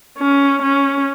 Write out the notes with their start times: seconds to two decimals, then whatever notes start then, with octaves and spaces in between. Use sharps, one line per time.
0.18 C#4
0.62 C#4